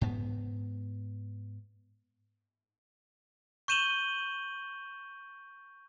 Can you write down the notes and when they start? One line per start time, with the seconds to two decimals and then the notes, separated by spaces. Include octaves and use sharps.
0.01 G#2 B3
3.68 C#6 G6 D#7 E7 F#7 G7